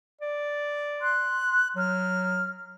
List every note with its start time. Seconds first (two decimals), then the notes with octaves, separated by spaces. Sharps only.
0.21 D5
1.02 C6 F#6
1.76 F#3 F6